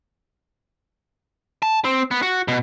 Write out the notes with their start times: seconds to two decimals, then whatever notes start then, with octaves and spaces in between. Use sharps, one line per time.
1.62 A5
1.85 C4
2.11 B3
2.23 F#4
2.48 B2